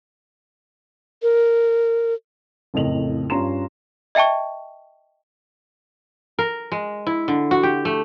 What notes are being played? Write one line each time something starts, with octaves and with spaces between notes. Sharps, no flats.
A#4
F#1 F2 A2 D#5 F7 F#7
G2 C#4 F4 A#5 C6 E7
D#5 E5 G5 A5 C#6
A#4
G#3
E4
D3
F#4
G4
A3